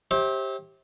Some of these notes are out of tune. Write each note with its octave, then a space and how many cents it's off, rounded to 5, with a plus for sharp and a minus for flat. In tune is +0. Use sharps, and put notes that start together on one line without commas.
G4 +0 C5 +35 E5 -30